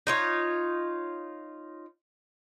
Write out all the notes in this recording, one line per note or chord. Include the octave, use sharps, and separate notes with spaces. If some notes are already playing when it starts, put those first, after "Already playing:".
D#4 F4 C#5